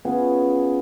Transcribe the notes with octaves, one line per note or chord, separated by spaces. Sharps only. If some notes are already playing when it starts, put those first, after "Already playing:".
B3 C#4 F4 G#4